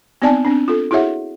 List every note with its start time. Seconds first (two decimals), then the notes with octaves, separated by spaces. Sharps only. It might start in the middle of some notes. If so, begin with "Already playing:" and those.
0.22 B3 C4 D#4 D5 G#5 A5
0.45 C4 D4
0.68 F4 A4
0.91 E4 F#4 G#4 C#5 E5 F#5